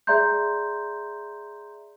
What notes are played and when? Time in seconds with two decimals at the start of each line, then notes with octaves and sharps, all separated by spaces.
0.07 G#4 D5 E5 A#5 C6 G6